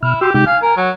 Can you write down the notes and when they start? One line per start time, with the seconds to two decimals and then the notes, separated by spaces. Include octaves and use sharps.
0.03 B2 E4 F6
0.21 F#4 G4 C6 E6
0.34 C3 G#3 D#4 G4
0.46 F5 G#5
0.63 A#4
0.76 F#3